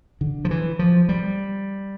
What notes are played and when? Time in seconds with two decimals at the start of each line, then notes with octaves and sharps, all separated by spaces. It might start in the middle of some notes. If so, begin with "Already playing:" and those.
0.21 D3
0.45 F3
0.51 E3
0.79 F3
1.09 G3